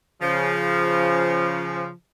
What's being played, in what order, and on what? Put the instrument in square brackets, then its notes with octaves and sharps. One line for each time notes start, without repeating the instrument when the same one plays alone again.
[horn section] C#3 F3